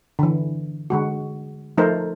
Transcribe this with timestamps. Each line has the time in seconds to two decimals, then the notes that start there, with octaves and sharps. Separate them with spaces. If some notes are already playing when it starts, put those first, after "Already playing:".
0.19 D3 E3
0.90 D3 G#3 F#4
1.77 F3 A3 D#4 A4 A#4 C5